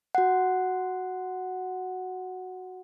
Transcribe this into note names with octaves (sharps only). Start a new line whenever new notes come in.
F#4 F#5